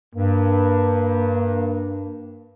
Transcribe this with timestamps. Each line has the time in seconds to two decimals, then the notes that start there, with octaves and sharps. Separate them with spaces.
0.15 G2 A#3